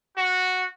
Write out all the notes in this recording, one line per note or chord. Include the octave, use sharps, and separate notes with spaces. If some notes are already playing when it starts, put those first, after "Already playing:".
F#4